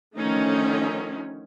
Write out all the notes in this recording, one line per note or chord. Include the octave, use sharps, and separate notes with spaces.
D3 D#3 F3 A3 C#4 D#4